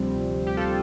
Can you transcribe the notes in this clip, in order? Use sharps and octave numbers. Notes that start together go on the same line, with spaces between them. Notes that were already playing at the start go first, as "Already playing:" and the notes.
Already playing: D2 C3 F3 G3 C4
G4
F4 A4